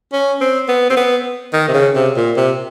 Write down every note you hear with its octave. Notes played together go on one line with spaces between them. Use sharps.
C#4
C4
B3
C4
B3
D#3
C3
C#3
C3
A#2
C3